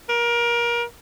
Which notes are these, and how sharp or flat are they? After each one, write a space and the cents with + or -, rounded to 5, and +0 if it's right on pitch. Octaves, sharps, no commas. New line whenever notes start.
A#4 +25